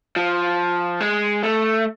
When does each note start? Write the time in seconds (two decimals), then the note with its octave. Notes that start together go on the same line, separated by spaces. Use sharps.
0.16 F3
1.00 G#3
1.43 A3